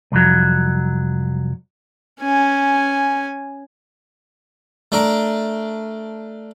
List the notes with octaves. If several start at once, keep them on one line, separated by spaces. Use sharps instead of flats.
C2 F2 F#3
C#4 G#5
A3 D4 A#4